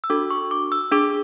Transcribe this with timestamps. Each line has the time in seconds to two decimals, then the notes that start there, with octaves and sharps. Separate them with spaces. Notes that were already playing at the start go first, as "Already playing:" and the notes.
0.04 E6
0.10 D4 F#4 A4 D6
0.31 C#6
0.51 D6
0.72 E6
0.92 D4 G#4 D6